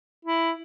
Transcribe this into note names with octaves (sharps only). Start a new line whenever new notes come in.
E4